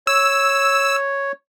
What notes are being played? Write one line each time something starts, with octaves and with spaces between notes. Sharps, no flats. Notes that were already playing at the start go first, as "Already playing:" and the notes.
C#5 E6